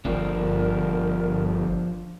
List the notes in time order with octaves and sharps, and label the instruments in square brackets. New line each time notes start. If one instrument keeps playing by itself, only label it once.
[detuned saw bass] G1 [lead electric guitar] F3 D4 [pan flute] A#4